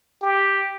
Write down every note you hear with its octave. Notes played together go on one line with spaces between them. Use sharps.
G4